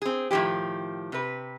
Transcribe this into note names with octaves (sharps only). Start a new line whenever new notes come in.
C4 G#4
A2 D#3 F3 G#3 G4
C3 B4